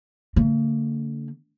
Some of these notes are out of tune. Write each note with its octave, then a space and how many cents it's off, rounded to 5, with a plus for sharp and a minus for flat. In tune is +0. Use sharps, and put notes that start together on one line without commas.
D3 -35 A#3 -45